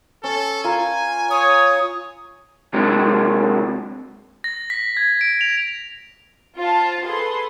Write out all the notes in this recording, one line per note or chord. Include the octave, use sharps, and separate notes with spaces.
C#4 A4
F4 A#4 G#5
C#5 D#6
C3 F#3 G#3 A#3 C4 D4
A#6
B6
G#6
D7
F7
F4 C5 F5 A5
G#4 A4 B4 C6